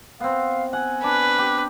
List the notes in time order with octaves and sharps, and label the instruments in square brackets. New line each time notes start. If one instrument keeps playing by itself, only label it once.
[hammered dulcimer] B3 C4 [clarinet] F5
[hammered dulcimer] F#5 [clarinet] G#5
[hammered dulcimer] D4 [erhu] B4
[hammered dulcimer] G4